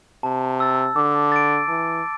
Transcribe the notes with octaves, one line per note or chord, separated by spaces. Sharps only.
C3 A5
E6 A6
D3 D6
A6 D7
E3 A5